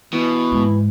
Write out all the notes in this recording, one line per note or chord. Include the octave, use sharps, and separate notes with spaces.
B2 E3
G#2